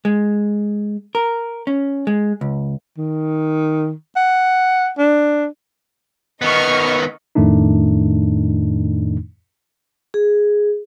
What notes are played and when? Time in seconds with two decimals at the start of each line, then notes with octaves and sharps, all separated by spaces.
0.05 G#3
1.15 A#4
1.67 C#4
2.07 G#3
2.41 C#2
2.98 D#3
4.16 F#5
4.98 D4
6.42 D#3 B3 D#5 C#6 F6
7.35 F2 A2 D#3 A3 D4 D#4
10.14 G#4